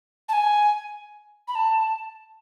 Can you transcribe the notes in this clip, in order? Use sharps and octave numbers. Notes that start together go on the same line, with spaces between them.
A5
G#5
B5
A5